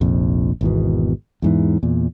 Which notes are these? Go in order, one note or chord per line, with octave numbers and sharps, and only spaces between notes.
F1 A#1 F2
G#1 E2 B2
E2 G#2 E3
E2 A#2